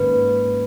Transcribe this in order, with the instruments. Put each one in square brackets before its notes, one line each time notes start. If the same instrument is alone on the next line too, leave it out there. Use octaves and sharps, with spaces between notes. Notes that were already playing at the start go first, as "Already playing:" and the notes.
Already playing: [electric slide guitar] G#2 D#3 A#3 C#4 [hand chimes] B4